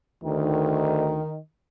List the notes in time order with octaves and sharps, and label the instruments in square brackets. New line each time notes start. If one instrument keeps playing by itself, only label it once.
[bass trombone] D2 [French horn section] D#3